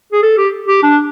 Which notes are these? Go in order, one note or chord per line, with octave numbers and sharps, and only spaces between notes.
G#4
A4
G4
G4
D4